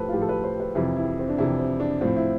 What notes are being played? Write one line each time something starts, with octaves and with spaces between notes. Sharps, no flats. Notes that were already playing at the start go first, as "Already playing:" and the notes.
Already playing: A2 F3 G4 A4 B4 C5
F4
A2 F3 G4
A4
B4
C5
B4
F2 C3 E3 E4
E4
C4
D4
F2 C3 E3 E4
C4
D4
A2 F3 C4
E4